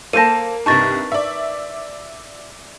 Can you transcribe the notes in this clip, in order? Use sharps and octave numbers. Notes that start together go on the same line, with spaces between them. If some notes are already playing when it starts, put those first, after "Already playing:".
A#3 A4 C5 A5 A#6 D#7
C2 G2 D#4 A#4 B4 A5 C#6 A6
D5 E5